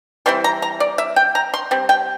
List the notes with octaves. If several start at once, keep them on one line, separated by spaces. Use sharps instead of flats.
E3 G3 C4 E4 C6
A#5
A#5
D5
E5
G5
A#5
C6
G3 C4
G5